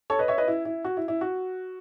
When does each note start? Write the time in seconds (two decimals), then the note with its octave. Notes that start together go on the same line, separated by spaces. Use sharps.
0.10 A4 C#5
0.19 B4 D#5
0.28 C#5 E5
0.38 B4 D#5
0.48 E4
0.65 E4
0.85 F#4
0.97 E4
1.08 E4
1.21 F#4